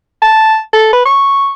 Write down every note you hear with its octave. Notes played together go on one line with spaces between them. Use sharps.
A5
A4
B4
C#6